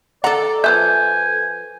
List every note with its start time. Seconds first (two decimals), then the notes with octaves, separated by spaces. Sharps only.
0.24 A4 D5 F#5 A#5
0.64 F3 B4 E5 G#5 G6